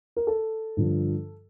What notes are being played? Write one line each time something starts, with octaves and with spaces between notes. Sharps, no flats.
A#4
A4
G2 D3 F3